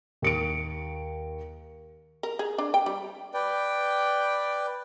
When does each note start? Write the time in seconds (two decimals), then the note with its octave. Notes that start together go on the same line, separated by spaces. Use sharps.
0.22 D#2 C#7 D7
2.23 A#4
2.39 G#4
2.58 D4
2.74 G5
2.86 G3
3.34 B4 D5 G5